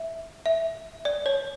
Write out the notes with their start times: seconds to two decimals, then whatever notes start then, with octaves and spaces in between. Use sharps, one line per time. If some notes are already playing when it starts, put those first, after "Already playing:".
Already playing: E5
0.46 E5
1.05 D5
1.26 C#5